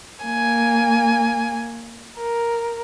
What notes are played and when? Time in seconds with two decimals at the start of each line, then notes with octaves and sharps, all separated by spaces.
0.24 A#3 G#5
2.17 A#4